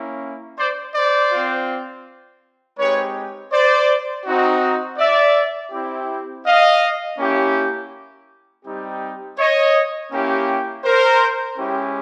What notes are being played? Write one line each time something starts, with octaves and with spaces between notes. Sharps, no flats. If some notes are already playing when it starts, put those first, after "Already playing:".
Already playing: A#3 C#4 E4
C5 D5
C5 D5
C4 F4
G#3 C4 D#4 G4 B4 C#5
C5 D5
C4 D#4 F#4
D5 E5
C4 E4 G4
D#5 F5
A#3 C#4 E4 G4
G3 C4 D#4 G4
C#5 D#5
A#3 C#4 E4 G4
A#4 C5
G#3 C#4 E4 G4